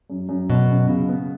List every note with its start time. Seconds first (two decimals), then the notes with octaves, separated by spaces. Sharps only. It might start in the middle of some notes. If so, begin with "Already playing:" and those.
0.10 F#2
0.29 F#2
0.50 F#2 B2
0.70 F#2
0.89 C#3
1.09 B3